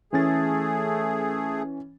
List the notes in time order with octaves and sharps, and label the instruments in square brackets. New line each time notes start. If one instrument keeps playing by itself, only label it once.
[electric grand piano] E3 C#4 A6 [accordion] A3 G#4